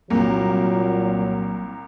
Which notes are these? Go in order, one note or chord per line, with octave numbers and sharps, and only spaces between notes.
C2 A#2 F#3 A#3